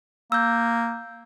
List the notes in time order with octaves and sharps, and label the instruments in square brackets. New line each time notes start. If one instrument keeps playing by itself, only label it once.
[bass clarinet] A#3 [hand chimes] E6 G6